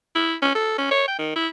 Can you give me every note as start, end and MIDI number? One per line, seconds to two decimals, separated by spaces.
0.16 0.35 64
0.42 0.51 61
0.55 0.77 69
0.78 0.90 61
0.91 1.07 73
1.08 1.17 79
1.19 1.33 51
1.36 1.47 64